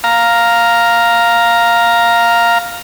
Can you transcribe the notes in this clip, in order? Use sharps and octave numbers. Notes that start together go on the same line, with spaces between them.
F5 A#5